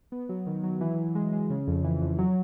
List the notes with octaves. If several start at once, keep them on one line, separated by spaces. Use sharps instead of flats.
B3
F#3
D#3
F#3
E3
E3
G#3
G#3
C#3
F2
E3
F2
F#3